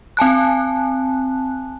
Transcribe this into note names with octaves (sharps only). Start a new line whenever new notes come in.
C4 G#5 A5 F#6